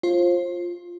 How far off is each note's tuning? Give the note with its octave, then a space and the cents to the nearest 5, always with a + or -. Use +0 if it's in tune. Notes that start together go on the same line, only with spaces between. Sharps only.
F4 +0 C5 +30